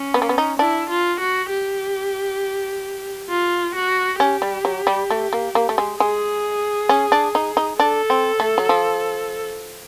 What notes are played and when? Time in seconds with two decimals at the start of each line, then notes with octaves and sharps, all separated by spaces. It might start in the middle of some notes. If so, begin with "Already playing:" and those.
Already playing: C#4
0.14 B3
0.22 A#3
0.29 B3
0.38 D#4
0.59 D4 E4
0.89 F4
1.20 F#4
1.50 G4
3.30 F4
3.75 F#4
4.20 C#4 G4
4.42 G3
4.65 F#3
4.87 G3
5.10 A3
5.33 A#3
5.55 A#3
5.69 A3
5.78 G#3
6.00 G#3 G#4
6.89 C#4
7.12 D4
7.35 D#4
7.57 D#4
7.80 D4 A4
8.10 C4
8.40 A3
8.58 F#3
8.69 F3